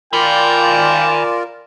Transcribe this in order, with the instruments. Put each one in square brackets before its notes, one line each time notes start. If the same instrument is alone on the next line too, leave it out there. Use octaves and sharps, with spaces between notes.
[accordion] F4 A#4 D5 [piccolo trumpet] G5 [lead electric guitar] G#5 B5